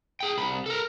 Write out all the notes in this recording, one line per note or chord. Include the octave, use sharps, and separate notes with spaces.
G#4 G5
C2 B5
A4 A#4